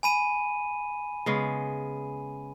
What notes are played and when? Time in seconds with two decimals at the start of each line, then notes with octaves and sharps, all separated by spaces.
0.03 G#5 B5 D#7
1.26 C#3 G#3 B3